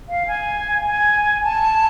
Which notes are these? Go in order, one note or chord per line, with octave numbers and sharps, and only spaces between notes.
F5
G#5
G#5
A5